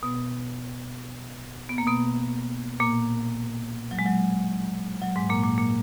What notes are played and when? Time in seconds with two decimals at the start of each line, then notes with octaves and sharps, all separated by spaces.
0.03 B2 B3
1.69 B3
1.78 A#3
1.87 B2 B3
2.80 A#2 A#3
3.91 F#3
3.99 G#3
4.06 F#3
5.02 F#3
5.16 G#2 G#3
5.30 A#2 A#3
5.43 A#2 A#3
5.57 A#2 A#3